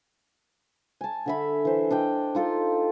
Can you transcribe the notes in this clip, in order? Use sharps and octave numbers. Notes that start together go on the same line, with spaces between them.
G#5 A5
D3 E5 B5
E3 C5
D4 D#5 G5
D#4 F4 A4